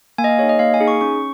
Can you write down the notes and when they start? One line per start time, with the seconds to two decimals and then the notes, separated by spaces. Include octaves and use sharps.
0.18 A#3 G#5
0.24 D#5
0.29 F5
0.39 G#4 C#5
0.43 D#4
0.49 D#5
0.59 A#3 F5
0.74 G#5
0.81 D#4 G#4
0.88 C#6
1.01 C#4 C#6